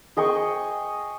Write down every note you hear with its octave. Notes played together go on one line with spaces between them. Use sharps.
G#4 D#5 G5 C#6